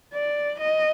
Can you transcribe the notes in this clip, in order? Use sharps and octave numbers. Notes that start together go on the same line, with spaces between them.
D5
D#5